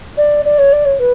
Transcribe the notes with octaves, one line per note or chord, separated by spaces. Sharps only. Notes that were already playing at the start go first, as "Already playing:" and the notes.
D5
D5
C#5
D5
C#5
B4